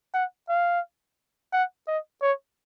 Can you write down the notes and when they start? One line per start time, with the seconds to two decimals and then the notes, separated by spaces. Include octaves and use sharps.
0.14 F#5
0.49 F5
1.53 F#5
1.88 D#5
2.22 C#5